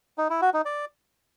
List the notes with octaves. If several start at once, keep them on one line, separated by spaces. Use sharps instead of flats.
D#4
E4
F#4
D#4
D5